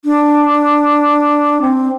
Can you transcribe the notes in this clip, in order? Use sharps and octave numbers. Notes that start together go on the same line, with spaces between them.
D4
C4